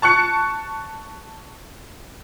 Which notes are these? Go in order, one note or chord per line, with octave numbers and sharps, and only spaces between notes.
A5 C#6 F#6 C#7